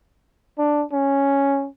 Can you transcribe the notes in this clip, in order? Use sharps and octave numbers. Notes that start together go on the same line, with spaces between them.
D4
C#4